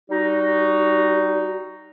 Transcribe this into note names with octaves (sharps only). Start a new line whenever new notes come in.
G3 D#4 F#4